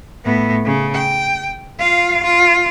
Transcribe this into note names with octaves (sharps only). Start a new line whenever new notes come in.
A2 B3
C#3
G5
F4 F5
F4